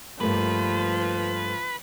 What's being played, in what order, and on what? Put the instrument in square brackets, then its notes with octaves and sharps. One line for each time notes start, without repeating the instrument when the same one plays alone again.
[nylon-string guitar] G2 A3 A#3 [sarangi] F3 [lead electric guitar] B4